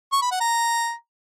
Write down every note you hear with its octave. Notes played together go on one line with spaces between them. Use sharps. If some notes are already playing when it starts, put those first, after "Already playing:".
C#6
B5
F#5
A#5